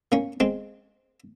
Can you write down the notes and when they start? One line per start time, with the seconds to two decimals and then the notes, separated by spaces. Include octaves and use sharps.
0.12 A#3 C#4
0.40 G#3 C4